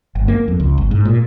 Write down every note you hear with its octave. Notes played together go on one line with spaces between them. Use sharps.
G1
A#3
F2
C#2
G1
G#2
A#2